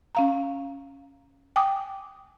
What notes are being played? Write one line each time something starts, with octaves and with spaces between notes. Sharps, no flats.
C#4 F5 A#5
G5 G#5 D6 D#6